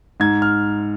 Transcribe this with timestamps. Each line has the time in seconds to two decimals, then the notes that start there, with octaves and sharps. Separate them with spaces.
0.20 G#2 G#6
0.42 F6